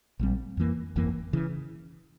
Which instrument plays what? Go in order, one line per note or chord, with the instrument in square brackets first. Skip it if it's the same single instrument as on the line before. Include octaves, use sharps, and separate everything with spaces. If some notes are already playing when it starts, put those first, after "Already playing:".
[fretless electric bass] A#1 G#2 G3 C4
F2 E3 A#3
G1 F2 E3 A#3
C#3 E3